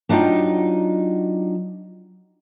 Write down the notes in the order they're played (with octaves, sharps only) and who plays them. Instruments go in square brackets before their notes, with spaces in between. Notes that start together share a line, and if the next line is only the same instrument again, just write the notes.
[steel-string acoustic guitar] F#3 D4 D#4 F4 G5